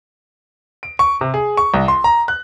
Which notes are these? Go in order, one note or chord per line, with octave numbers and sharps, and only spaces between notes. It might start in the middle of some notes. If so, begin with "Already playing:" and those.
D7
C#6
C3
G#4
C#6
C2
C6
A#5
F#6